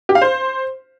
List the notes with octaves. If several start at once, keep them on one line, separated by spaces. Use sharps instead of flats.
G4
F5
C5